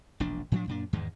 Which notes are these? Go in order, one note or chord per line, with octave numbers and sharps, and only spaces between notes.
E1 A#1 D4
A2 F3 D4
F#2 A#2 D4
E2 G#2 D#3 G#3